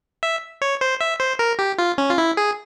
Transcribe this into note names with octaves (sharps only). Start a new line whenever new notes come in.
E5
C#5
C5
E5
C5
A#4
G4
F4
C#4
F4
E4
G#4